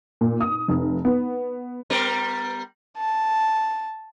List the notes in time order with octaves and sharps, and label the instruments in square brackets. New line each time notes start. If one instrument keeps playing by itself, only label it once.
[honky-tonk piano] A#2
D#6
F1
B3
[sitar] G3 B3 A#4
[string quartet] A5